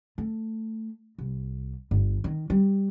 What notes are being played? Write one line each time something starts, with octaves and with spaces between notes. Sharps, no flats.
A3
C2
G1
D#3
G3